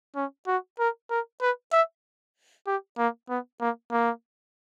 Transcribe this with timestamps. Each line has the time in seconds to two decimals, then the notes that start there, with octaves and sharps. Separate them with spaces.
0.16 C#4
0.47 F#4
0.79 A#4
1.10 A#4
1.41 B4
1.72 E5
2.67 G4
2.98 A#3
3.29 B3
3.61 A#3
3.92 A#3